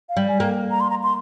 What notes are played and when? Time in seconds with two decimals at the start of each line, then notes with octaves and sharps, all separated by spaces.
0.09 F5
0.17 G3
0.28 G#5
0.39 A#3 G5
0.71 A#5
0.80 C6
0.90 A#5
1.03 C6